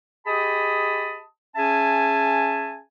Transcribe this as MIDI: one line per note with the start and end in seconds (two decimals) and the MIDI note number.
0.26 1.21 67
0.26 1.21 68
0.26 1.21 75
0.26 1.21 81
0.26 1.21 83
0.26 1.21 87
1.56 2.77 61
1.56 2.77 68
1.56 2.77 76
1.56 2.77 80
1.56 2.77 81